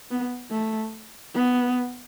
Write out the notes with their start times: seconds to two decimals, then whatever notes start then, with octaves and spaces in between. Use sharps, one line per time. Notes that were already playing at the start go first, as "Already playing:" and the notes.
0.11 B3
0.52 A3
1.35 B3